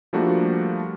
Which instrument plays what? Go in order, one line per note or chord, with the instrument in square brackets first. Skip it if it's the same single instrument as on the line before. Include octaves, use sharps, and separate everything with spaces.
[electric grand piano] F3 G3 A3 A#3 D4 F#4